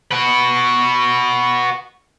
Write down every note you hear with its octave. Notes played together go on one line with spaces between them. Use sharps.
F#4 B4